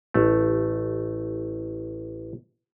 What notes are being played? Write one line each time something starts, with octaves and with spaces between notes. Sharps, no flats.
A1 A3